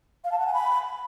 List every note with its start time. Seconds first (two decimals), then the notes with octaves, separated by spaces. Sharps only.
0.24 F5
0.32 A5
0.39 F#5
0.46 G#5
0.54 B5